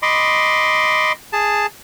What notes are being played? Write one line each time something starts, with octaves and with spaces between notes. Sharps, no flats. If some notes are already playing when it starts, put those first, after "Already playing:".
D#5 B5 C6 D6
G#4 A5